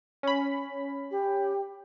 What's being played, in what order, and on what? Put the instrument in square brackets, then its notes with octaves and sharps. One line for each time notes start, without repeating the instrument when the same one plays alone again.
[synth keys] C#4 B5
[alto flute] G4